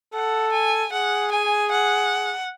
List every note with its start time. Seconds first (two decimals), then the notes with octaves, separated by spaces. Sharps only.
0.14 A4 F#5
0.52 G#5
0.92 G#4 F#5
1.31 G#5
1.71 F#5